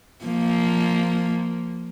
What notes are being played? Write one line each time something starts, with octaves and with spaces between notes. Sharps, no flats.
F3 A#3